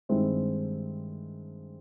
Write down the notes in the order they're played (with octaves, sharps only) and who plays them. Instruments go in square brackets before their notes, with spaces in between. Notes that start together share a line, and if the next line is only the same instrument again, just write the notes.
[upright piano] G2 D#3 G#3 C4 E4